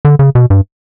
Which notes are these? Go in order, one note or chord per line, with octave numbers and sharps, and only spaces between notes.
D3
C#3
B2
G2